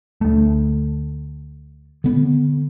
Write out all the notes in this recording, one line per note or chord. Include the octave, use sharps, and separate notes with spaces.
D2 A3
D3 B3